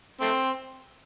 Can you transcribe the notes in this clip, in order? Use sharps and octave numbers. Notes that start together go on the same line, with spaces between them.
A3 C4